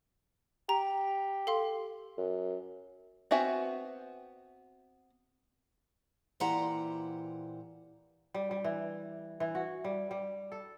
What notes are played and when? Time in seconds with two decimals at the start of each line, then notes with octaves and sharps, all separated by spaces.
0.69 G4 A#5
1.47 A4 F5 C6
2.18 F#2
3.31 B3 C4 F#4 E5 G#5
6.40 A#2 E3 G4 C5 F#5 A#5
8.34 G3
8.51 G3
8.64 E3
9.40 E3
9.55 F#4
9.84 G3
10.11 G3
10.52 A4